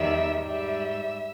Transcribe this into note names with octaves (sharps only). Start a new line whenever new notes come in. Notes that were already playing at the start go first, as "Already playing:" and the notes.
Already playing: E2 D#3 G3 E5
G#2 G3 E5